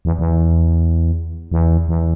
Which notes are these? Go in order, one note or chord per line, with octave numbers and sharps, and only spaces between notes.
E2
E2
E2
E2